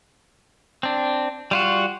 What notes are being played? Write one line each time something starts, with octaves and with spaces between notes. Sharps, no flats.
C4 D4
G3 F4 F#4